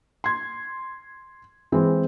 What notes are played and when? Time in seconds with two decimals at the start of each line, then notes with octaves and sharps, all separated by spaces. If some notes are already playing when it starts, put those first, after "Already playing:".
0.24 C6 G#6
1.72 E3 G#3 C4